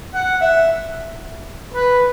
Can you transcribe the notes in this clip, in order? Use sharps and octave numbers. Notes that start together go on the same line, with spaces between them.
F#5
E5
B4